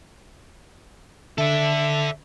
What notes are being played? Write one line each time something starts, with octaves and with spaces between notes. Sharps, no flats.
D3 A4 D5 E5